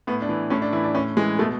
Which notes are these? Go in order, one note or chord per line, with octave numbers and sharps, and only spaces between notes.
A2 B3
D4
E3
A2 C#4
D4
E3 E4
D4
A2 C#4
E3 G#3
B2 A3